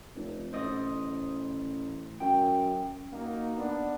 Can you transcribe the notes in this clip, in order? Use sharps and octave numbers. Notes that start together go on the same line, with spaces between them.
F1
A1 C5 D#5
F#2 G5
A#3 D#4 F#4
B3 D4